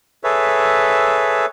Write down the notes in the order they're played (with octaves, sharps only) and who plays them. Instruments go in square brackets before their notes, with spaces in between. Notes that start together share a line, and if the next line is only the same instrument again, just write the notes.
[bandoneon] G#4 A4 B4 C#5 E5